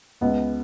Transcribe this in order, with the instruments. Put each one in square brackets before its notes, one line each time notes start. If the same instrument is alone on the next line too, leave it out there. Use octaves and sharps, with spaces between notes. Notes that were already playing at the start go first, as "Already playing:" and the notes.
[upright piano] C#2 B3